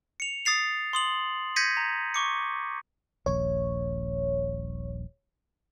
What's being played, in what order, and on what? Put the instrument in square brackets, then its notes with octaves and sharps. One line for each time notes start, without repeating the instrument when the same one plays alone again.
[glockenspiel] C#7 F7
D#6 A6 C7 F7
C6 D#6 F#7
G6 G#6 A#6 B6 C#7 D#7
A#5
C#6 D6 C#7
[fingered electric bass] D#1 A#1 [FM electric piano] C#5